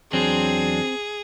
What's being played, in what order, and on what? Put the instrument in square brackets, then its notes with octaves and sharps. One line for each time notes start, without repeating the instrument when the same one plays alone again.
[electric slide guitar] E2 F#3 D4 [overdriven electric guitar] C4 [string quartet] G#4